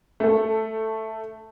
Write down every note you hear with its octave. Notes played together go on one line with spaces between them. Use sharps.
A3 A4